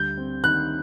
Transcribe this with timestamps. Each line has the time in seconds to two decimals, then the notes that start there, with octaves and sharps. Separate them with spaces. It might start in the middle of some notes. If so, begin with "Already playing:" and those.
Already playing: D2 G3 G6
0.17 C4
0.44 D#3 F#6